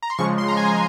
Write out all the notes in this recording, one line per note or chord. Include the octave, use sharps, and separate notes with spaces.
A#5
C6
C#3 F3 G#3 C#6
C6
A#5
G#5